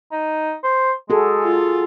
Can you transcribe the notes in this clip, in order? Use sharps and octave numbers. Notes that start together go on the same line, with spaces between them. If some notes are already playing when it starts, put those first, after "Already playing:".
D#4
C5
G#3 F#4 G#4 A4
F4